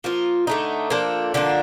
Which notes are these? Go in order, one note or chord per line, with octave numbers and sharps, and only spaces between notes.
F3 A#3 F4
D3 A3 D#4
F3 A#3 D4 A4
D3 F3 A#3 D4